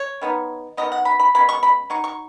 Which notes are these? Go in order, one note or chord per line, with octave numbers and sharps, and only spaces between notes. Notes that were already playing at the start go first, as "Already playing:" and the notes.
Already playing: C#5
D#3 B3 D#4
D#3 F#3 B3 D#5
F#5
B5
B5
B2 G#3 C#4 B5
C#6
B5
F#3 D#4 C#6
C#6